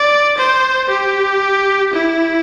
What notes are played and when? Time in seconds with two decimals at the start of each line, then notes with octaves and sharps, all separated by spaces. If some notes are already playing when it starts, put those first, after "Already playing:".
Already playing: D5
0.37 C5
0.90 G4
1.93 E4